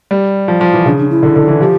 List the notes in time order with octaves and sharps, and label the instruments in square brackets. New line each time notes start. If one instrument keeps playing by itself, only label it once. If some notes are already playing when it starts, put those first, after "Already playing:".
[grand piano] G3
F3
F3
E3
[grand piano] C#3 [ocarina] D4
[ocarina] D4
E4
[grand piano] D3
D3
E3
[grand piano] F3 [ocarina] G4